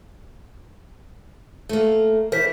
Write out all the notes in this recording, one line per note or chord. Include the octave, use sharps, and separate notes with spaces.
A3 A#3
E3 A#4 C5 B6